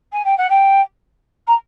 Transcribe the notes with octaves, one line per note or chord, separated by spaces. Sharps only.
G#5
G5
F#5
G5
A#5